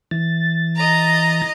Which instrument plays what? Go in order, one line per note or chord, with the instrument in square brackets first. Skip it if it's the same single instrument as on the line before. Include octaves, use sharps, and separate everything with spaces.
[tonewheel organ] E3 A6
[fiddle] D#5 A#5